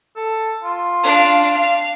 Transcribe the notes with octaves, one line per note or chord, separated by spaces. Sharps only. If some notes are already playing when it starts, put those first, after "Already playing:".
A4
F4
D4 F5
F5